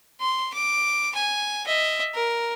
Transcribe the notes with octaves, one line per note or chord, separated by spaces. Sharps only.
C6
D6
G#5
D#5 E5
A#4